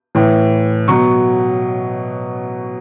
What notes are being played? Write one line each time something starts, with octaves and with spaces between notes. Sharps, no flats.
A2 E3
B2 F#3 C#6